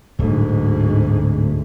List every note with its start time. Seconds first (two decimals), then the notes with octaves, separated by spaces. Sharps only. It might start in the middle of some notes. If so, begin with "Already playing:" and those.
0.19 D1 D2 G#2